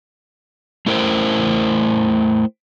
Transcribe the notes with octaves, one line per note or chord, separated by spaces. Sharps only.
A3 E4 A#4 C5 G5